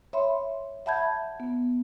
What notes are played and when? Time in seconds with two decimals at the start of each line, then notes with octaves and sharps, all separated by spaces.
0.13 C#5 E5 B5 C6
0.86 E5 F#5 A5 B5 G6 G#6
1.40 B3